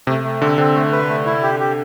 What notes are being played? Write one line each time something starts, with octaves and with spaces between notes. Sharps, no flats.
C3 A3
A3
D3 C4
D3 C4
A3
B4
A3
E4
G4
G4